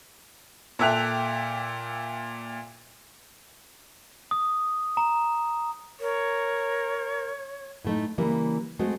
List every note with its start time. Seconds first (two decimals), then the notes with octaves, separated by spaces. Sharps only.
0.79 A#2 A4 E5 G5 F#6 F7
4.31 D#6
4.97 A#5
6.00 A#4 C#5
7.85 A2 A3 D#4
8.18 C#3 E3 G3 A#3
8.79 G#3 A3 C4 F#4